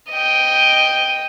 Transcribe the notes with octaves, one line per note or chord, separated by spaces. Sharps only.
D#5 G5